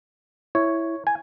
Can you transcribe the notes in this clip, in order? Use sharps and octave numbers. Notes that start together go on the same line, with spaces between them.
E4 C#5
G#5